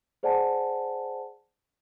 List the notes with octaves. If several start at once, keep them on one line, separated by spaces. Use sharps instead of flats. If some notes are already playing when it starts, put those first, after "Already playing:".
G#4 C5 D5 F#5 G#5 A5